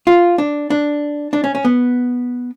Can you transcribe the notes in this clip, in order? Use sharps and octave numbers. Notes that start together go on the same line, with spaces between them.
F4
D4
D4
D4
C#4
C#4
B3